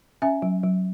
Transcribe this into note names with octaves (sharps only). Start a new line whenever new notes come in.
C#4 E5 G#5
F#3
F#3